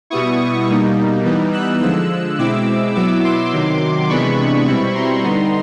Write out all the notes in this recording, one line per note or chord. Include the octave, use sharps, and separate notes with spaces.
B2 G3 B3 E4 C#6 D#6
B2 G3 A#3 D#4
E3 G3 B3 D#4
E6 F#6
D3 F3 G#3 E6 F#6
B2 G#3 C4 E4 D6 E6
B2 F#3 B3 E4 D6 E6
C6 D6
C3 D#3 F#3
C3 E3 G#3 B3 D4 B5 C#6
B2 G3 C4 E4 B5 C#6
A#5 C6
D3 G3 B3 D#4